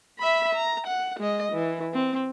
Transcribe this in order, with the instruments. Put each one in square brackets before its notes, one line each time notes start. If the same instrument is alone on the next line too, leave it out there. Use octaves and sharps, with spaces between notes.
[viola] E5 B5
A#5
F#5
G#3 D#5
E3
C4